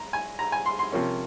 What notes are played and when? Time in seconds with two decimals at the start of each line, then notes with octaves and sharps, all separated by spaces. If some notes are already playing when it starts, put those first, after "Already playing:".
Already playing: A#5
0.13 G#5
0.39 A#5
0.52 G#5
0.66 C6
0.79 C6
0.92 C3 F3 A#3 C#4